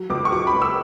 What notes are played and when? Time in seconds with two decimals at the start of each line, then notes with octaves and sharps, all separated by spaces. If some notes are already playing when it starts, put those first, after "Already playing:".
Already playing: F#3
0.10 C#2 D6
0.25 C#6
0.32 F#3 D6
0.47 B5
0.54 C#2
0.62 E6